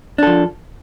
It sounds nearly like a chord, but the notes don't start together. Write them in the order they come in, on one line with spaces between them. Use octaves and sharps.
D4 A4 F3